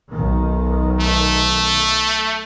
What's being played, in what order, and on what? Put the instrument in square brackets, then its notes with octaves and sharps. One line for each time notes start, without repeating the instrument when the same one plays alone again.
[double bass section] B1 D#3
[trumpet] A3